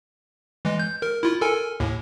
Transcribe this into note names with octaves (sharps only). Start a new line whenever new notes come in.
E3 G#3
G6
A#4
E4 F4
A4 A#4 G#5
D#2 A2